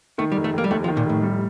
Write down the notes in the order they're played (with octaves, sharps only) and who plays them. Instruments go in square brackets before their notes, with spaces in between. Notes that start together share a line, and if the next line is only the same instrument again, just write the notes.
[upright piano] D#3 [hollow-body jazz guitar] A3
[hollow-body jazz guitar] G3
[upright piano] F1
[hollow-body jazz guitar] A3
[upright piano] F1 [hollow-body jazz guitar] A#3
[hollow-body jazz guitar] G3
[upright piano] D#2 [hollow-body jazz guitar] A3
[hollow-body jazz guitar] F3
[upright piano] D#3
[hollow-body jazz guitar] A#2
[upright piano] F1 [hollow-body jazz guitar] A2
[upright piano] G3